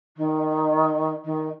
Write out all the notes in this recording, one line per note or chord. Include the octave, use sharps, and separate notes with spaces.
D#3
D#3